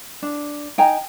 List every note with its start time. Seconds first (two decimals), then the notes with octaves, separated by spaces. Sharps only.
0.22 D4
0.78 D#4 G5 G#5 A#5